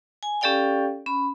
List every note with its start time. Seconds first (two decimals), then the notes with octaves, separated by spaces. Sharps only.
0.23 G#5
0.41 C#4 G4 A4 D5 F5 G5
1.06 C#4 B5